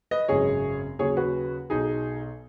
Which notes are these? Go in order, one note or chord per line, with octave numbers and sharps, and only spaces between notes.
B4 D#5
G#1 F#2 C#3 F#3 G#4 C#5
D#2 C#3 F#3 G#4 C#5
F#4 B4
B1 B2 F#3 D#4 G#4